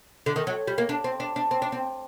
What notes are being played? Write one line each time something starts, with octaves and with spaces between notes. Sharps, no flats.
D3
D#3
F#3
G3
A#3
D4
C4
D4
D4
C4
D4
C4